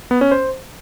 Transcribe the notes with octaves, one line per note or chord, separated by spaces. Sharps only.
B3
C#4
C5